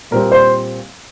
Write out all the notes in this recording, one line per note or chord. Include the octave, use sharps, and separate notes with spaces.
A#2 G3 C4 A#4
C5